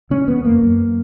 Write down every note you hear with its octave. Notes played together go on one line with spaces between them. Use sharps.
C#3 C#4
E2 B3
F#2 A#3
F#2